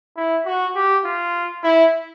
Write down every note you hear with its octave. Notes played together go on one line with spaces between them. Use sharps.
E4
F#4
G4
F4
E4